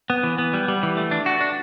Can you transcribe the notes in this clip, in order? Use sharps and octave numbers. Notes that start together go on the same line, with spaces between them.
B3
E3
B3
G3
G3
E3
A3
D4
F#4
D4